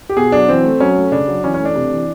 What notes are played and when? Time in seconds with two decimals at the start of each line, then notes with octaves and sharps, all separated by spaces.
0.09 G4
0.17 B2 G#4
0.32 F#3 D4
0.48 E3 C4
0.64 A3
0.80 F#3 C#4
0.96 A3
1.12 C#3 D4
1.28 F#3
1.43 E3 C#4
1.54 C#4
1.60 A3
1.65 D4
1.75 C3
1.91 E3